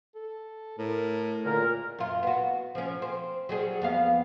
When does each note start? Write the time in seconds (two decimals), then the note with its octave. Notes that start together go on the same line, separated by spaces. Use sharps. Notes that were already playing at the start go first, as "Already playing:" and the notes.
0.15 A4
0.79 A2 A#4
1.44 C#2 A#2 D3 A#4
1.98 F#2 F4
2.23 B3 F#4
2.75 F3 C#4
3.02 C4
3.49 F#3 G3 G#4
3.82 F2 B3 F5